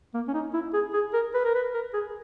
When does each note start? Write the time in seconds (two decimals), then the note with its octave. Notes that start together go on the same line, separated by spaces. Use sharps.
0.14 A#3
0.28 C#4
0.34 D#4
0.54 E4
0.74 G#4
0.94 G#4
1.14 A#4
1.34 B4
1.45 A#4
1.55 B4
1.74 A#4
1.94 G#4